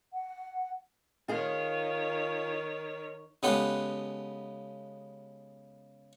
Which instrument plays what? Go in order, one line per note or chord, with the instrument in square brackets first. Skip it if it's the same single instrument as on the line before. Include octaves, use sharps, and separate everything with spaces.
[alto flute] F#5
[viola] D#3 C#5 [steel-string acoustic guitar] F4 G#4
[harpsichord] C#3 G#3 B3 G4 A4 B4